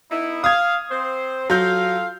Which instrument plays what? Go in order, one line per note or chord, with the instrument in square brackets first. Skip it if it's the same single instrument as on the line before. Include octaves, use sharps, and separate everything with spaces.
[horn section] B3 D#4 E4
[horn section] F5 [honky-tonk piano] D#6 G#6
[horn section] C4 C5
[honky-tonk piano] F#3 G6 [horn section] F4 A4 F5